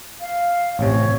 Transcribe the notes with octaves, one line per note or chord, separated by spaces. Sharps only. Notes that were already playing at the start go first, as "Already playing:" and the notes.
F5
A1 C3 C#5